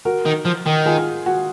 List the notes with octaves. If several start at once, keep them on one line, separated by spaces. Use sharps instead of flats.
F#4 A#4
D#3
F3
D#3
F4 G#4
F#4